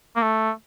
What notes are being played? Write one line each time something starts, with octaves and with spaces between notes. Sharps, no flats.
A#3
A3